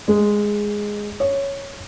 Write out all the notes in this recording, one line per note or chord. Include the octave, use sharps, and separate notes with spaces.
G#3
C#5